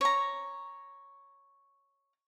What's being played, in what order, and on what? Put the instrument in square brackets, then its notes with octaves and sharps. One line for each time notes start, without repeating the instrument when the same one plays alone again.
[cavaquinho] C#5 A#5